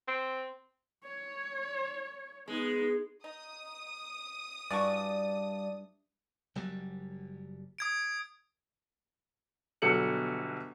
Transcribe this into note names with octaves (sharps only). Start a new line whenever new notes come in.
C4
C#5
G#3 B3 D#4
D#4 D#6
G2 E3 F#4 D5 A5 C#6
F#1 F#3 G3
D#6 G#6 D7
G1 B2 F#3 A4 C#7 F#7